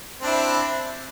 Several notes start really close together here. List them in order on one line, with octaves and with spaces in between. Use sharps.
C4 D4 E4